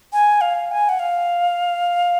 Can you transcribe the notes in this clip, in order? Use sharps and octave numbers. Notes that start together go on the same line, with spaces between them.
G#5
F5
G#5
F#5
F5